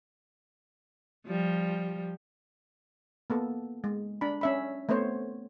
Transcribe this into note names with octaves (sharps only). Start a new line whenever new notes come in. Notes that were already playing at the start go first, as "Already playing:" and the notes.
F3 G3
A#3 B3 A4
G#3
D4 B5
C#4 E5 B5
A3 B3 C4 C5 C#5